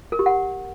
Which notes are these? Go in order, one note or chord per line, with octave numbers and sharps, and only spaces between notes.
A#4
G4
F#5